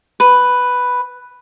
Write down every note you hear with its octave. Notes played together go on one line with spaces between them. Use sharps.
B4